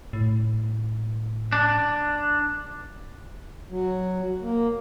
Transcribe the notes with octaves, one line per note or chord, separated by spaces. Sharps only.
A2
D4
F#3
A#3